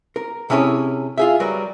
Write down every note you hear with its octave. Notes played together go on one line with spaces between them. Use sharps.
A#4
C3 C#4 E4 G#4 A4 C#5
F4 G#4 E5
F#3 G3 A#4 B4